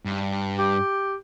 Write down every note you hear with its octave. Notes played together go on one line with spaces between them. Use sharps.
G2
G4